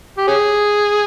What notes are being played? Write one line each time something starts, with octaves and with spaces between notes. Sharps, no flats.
G4
C#4 G#4